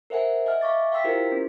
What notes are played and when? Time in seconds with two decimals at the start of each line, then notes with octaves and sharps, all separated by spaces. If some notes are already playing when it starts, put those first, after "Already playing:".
0.10 A#4 C5 E5 F#5 G#5
0.46 D#5 E5 G#5 F6
0.61 E5 F5 C#6 D6 A6
0.92 F5 G5 C6 E6 B6
1.04 E4 F4 G4 A#4 C5 C6
1.32 C#4